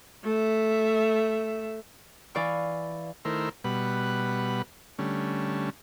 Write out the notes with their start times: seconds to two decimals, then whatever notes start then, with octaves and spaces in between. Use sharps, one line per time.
0.24 A3 E5
2.35 E3 D5 F5 C#6
3.25 D#3 A3 E4 A#4 C5
3.64 B2 G3 B4 F#5
4.99 D3 G3 A3 C#4